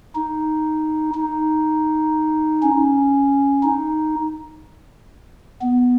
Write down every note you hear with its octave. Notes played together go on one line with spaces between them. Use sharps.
D#4
D#4
C#4
D#4
B3